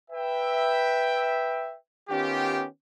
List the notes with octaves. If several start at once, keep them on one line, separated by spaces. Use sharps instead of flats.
B4 E5 G5
D#3 B3 C#4 F4 G4